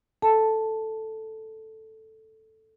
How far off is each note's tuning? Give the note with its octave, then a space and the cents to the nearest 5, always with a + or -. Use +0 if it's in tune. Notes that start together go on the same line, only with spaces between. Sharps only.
A4 +0 A5 +0